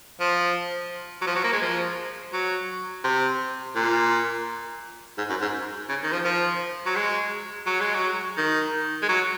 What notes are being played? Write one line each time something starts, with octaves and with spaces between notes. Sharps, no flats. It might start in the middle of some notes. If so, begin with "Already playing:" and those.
F3
F#3
F3
F#3
A#3
G#3
F3
F#3
C3
A#2
G#2
F#2
G#2
C#3
D#3
F3
F3
F#3
G#3
F#3
G#3
F#3
D#3
G#3
F#3